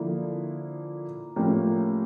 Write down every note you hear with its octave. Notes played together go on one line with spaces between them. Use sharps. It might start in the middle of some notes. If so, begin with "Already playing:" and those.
Already playing: D3 F3 A#3 E4
A2 F3 A#3 C#4 G4